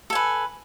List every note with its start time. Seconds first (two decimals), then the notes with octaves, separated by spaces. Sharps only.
0.10 A4
0.13 G#5
0.15 B4